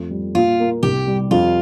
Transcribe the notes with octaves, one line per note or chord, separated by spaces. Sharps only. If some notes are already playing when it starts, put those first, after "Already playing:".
Already playing: F2 A3
G3
A#2 F4
A#3
C2 G4
G3
F2 F4